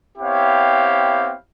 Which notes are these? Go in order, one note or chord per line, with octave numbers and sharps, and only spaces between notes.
B3 C4 E4 G4 C#5 F5